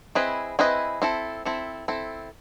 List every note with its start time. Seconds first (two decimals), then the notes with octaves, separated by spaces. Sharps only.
0.15 C4 E4 G#4 B4 D#5
0.59 C4 E4 G#4 B4 D#5
1.02 C4 E4 A4
1.45 C4 E4 A4
1.88 C4 E4 A4